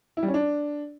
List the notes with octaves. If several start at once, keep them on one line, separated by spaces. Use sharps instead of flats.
E4
G3
C#4
D4